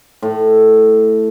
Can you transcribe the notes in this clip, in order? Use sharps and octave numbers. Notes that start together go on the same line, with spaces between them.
A2